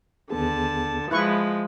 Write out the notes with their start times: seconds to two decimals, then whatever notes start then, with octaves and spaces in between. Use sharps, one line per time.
0.30 D#2 D3 B3 G#4 A5
1.11 F3 G#3 E4 B4 C#6 F#6